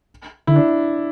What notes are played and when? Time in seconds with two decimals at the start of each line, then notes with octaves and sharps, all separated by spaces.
0.47 D3 E4
0.56 D4